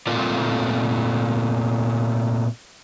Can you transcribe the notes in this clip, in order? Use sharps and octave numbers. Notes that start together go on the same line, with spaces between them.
A#2 A3 C4 F4 A#4 D5